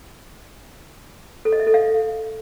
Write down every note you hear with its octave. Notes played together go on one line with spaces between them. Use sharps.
A4
D#5
E5
A4
F5